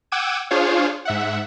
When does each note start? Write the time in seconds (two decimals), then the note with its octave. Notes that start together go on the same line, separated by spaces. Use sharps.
0.12 F#5 G5 D6 E6 G#6 D#7
0.51 D4 F4 G#4 C5 C#5 F5
1.05 G#2 E5 F#5